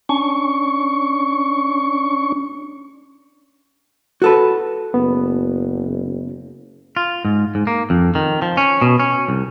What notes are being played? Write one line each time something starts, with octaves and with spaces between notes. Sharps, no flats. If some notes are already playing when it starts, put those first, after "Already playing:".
C#4 D4 C#6
F#4 A4 B4
F#1 B3
F4
G#2
G#2
A#3
F2
D#3
F3
C#4
B2
C#4
C2